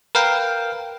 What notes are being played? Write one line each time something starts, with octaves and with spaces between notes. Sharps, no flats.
A#4 B4 F5 G5